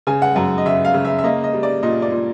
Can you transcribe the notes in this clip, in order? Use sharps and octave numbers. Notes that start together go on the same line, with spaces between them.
C#3 G#5
F#5
F#2 F#5
D#5
C#3 E5
F5
C#3
E5
E5
A#3 D#5
D#5
G3
D5
A#2 D#5
D5
A#2